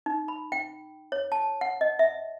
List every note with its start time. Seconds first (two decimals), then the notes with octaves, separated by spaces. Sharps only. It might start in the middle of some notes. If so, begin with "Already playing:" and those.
0.06 D#4
0.28 B5
0.52 G5
1.12 C#5
1.32 A5
1.61 F#5
1.81 D#5
1.99 E5